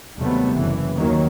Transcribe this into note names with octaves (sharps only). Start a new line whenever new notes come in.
D#2 C3 F#3 G3 A3 B3
F#1 E3
D#2 D#3 F#3 A#3